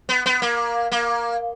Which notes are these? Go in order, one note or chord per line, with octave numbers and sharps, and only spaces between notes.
B3
B3
A#3
A#3